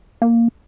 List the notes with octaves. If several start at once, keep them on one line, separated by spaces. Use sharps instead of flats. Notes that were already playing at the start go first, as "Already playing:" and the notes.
A#3